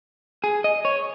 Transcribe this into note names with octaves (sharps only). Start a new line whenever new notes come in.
G#4
D#5
C#5